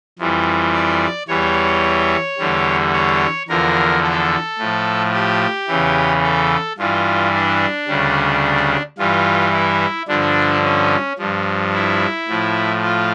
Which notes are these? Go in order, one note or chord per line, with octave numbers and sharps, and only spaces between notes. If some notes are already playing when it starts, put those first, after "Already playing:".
F2 E3 G3
D5
E2 E3 G3 C#5
E2 D3 G3
C#5
E2 D3 F3 A#4
A4
A2 F3
G4
E2 C#3 E3
A4
G2 E3 G3 F4
D4
D2 C#3 G3
G2 E3 G3 F4
E4
G2 D3 F3 D4
C#4
G2 F3
E4
A2 F3
F4